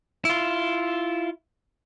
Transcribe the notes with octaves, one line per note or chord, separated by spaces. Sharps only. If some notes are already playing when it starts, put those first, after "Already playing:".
E4 F4